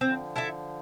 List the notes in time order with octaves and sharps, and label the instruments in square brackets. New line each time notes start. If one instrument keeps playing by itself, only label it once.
[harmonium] D3 F3 [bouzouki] C4
[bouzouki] E4 A4 E5